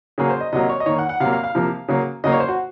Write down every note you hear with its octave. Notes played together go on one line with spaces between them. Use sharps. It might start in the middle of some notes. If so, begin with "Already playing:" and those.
C#3 F#3 A#3 G#4
C5
D#5
C3 F#3 A#3 D#5
C#5
D#5
D#3 A#3 C#5
F#5
F#5
C3 F#3 A#3 F5
F5
F5
C3 F3 A#3
C#3 F#3 A#3
C#3 F#3 A#3 D#5
C#5
C5
F#4